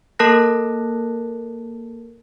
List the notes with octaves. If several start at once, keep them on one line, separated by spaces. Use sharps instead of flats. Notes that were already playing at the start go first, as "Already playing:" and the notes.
A#3 A4 A#4 A5 F#6 A#6